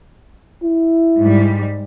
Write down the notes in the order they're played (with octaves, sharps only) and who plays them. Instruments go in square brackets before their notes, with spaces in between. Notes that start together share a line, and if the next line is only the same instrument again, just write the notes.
[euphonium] E4
[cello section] G#2 G3